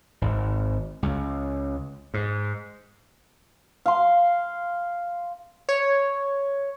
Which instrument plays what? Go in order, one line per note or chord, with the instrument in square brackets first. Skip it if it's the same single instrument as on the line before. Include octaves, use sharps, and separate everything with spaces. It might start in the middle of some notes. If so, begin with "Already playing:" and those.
[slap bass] G#1
C#2
G#2
[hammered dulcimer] F5 C6
[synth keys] C#5